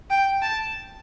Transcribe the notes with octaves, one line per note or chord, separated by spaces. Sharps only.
G5
A5